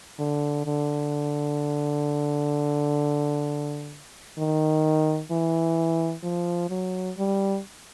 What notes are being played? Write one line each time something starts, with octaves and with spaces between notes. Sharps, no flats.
D3
D3
D#3
E3
F3
F#3
G3